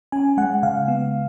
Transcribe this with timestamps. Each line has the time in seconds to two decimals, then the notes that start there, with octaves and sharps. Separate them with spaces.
0.12 C#4 G#5
0.37 G#3 F#5
0.63 C#3 F5
0.88 B3